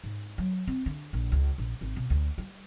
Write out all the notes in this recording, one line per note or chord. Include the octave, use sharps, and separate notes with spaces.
G#2
F#3
C4
D3
A#1
C#2
A#1
G#1
B2
D2
G3